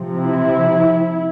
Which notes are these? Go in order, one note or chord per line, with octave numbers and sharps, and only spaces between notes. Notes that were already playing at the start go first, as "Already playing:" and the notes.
Already playing: C3 F3
E4